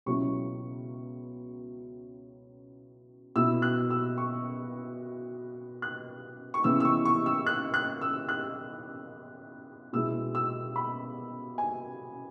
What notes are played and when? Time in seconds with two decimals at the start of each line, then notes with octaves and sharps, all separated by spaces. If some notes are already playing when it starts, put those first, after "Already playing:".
0.06 C#2 B2 F#3 C#4 E4 C#6
3.36 B2 B3 E4 E6
3.62 F#6
3.90 E6
4.18 C#6
5.82 F#6
6.54 C#6
6.64 C#3 E3 B3 E4 E6
6.80 E6
6.85 C#6
7.05 C#6
7.26 E6
7.46 F#6
7.74 F#6
8.01 E6
8.29 F#6
9.93 B2 G#3 B3 E4 E6
10.35 E6
10.76 B5
11.58 G#5